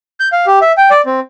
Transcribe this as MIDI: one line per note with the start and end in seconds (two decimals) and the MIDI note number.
0.20 0.29 91
0.32 0.46 77
0.47 0.59 67
0.62 0.72 76
0.78 0.90 79
0.91 1.01 74
1.06 1.20 60